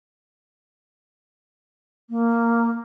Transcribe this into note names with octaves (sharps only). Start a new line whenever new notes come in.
A#3